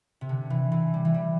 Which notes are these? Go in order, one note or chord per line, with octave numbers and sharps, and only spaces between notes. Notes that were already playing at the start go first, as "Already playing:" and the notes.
C3
D3
E3
E3
G3
E3
G3